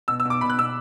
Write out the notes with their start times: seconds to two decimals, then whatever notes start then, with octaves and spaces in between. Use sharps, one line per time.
0.08 B2 E6
0.20 E6
0.25 B2
0.30 D6
0.41 B2 B5
0.50 F#6
0.58 B2 E6